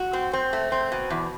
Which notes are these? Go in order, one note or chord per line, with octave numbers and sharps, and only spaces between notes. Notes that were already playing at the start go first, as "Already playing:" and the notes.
Already playing: F#4
C4
C4
A3
C4
B2
E2